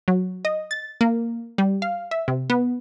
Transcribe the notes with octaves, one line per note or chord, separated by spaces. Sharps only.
F#3
D#5
A6
A#3
G3
F5
E5
C3
B3